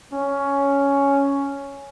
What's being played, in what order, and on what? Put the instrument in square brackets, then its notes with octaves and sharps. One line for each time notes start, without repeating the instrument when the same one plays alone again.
[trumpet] C#4